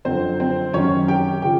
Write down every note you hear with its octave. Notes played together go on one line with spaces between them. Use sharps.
F#2 D3 F3 C4 C5
C4 C5
F#2 D#3 F#3 C#4 C#5
G4 G5
C#3 F3 G4 G5